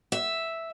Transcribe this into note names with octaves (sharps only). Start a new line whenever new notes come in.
E5